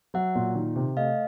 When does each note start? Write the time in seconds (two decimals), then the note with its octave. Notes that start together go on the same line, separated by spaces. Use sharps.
0.14 F#3 E5 F#5
0.35 A#2
0.55 D#3
0.76 C3
0.96 A3 D#5 F5